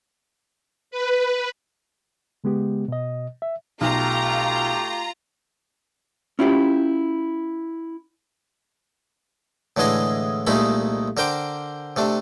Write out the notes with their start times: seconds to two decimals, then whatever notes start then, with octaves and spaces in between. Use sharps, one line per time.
0.91 B4
2.44 C#3 G#3 B3 G4
2.88 B2 D#5
3.42 E5
3.81 B1 A3 F4 G4 A#5 A#6
6.39 C#4 E4 F4 G4
9.77 A2 D3 E3 G#3 G#4 D#5
10.47 C2 A#2 G#3 A3 D#4 B5
11.17 D3 A#4 C5 G5 D6
11.96 C3 A3 D4